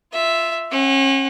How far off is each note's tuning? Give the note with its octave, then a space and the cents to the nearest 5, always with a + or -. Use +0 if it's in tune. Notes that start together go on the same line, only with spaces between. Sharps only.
F4 -10 E5 +0
C#4 -35 F#5 +15